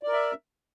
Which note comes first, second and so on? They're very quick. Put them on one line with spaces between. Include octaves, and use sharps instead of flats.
D5 A#4 E5